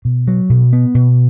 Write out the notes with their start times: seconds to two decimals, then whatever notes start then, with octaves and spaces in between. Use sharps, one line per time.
0.05 B2
0.28 F#3
0.50 B2
0.73 B3
0.95 B2